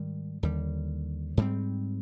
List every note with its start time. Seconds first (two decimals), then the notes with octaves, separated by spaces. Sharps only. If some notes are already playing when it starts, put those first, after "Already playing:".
Already playing: G#2 D#3 G3
0.43 D#2 D3 G3
1.37 G#2 G3 C4